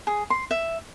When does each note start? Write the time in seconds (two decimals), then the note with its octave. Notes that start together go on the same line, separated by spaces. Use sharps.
0.07 G#4
0.30 C6
0.51 E5